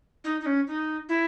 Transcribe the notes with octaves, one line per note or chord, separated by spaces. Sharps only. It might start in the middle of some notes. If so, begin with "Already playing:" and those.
D#4
D#4
C#4
D#4
E4